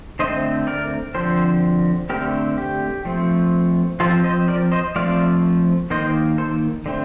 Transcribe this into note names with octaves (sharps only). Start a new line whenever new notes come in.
D3 A3 C4 C5 D#5
A#4 D5
D3 F3 C4 A4 C5
D3 A3 C4 G4 A#4
G4
F3 A3 C4
F3 C4 F4 A4
C5 D#5
A#4 D5
C5 D#5
F3 A3 C4 D5 F5
D#3 A#3 C5 D#5
A4 C5
D3 A3 C4